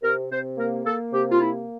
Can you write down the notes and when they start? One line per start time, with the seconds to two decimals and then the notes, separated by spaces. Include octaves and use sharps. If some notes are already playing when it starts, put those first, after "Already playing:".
0.03 C3 A#4
0.31 C3 C5
0.58 A#3 A#4
0.85 A#3 A4
1.13 C3 G4
1.32 F4
1.40 A#3 E4